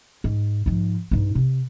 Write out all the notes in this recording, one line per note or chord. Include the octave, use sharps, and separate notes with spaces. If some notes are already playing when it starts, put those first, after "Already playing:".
G#2
G#2 F3
G2 D#4
C3